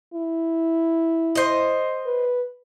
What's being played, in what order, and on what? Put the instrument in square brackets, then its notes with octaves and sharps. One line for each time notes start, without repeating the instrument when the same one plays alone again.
[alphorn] E4
[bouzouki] C5 D#5
[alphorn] B4